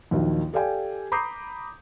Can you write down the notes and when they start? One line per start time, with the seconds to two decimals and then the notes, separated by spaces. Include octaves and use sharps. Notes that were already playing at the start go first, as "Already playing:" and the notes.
0.11 A#1 D#2 D#3 F#3
0.53 G4 A4 D5 F5 G5 G#5
1.12 A#5 B5 D6 D#6 G6 C7